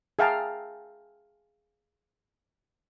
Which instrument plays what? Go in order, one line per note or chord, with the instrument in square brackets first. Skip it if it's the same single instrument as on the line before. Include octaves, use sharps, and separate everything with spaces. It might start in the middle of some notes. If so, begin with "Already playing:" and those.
[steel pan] G#4 E5 F5 G5 A5 A#5